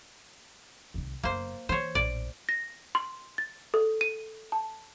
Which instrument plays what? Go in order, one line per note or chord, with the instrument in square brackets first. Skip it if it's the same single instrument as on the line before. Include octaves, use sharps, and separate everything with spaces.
[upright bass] C2 D#3
[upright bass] F#1 B3 [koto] A#3 C5
[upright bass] E3 [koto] C5 C#5
[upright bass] A#1 A2 [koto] D5
[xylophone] A#6
C6
A6
A4
D#7
A5